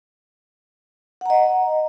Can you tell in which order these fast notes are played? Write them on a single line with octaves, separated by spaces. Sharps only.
F#5 A#5 D#5